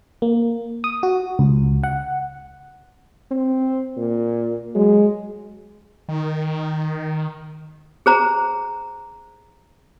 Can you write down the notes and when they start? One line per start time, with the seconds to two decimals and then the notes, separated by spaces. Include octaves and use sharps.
0.22 A#3
0.84 D#6
1.03 F#4
1.39 C#2
1.83 F#5
3.31 C4
3.97 A#2
4.75 F#3 G#3
6.09 D#3
8.06 G#4 C5 A#5